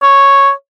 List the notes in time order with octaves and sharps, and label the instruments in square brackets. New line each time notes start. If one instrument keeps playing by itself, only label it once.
[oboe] C#5